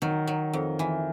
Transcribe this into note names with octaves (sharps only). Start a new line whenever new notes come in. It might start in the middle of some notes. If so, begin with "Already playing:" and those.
D#3 F#3
F#3
F2
E3